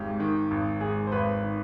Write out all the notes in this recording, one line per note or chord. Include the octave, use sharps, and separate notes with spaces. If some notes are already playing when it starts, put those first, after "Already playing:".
Already playing: G#1 G#2 G4
D#3
G#1
G#2 G#4
C5
G#1 B4
D#3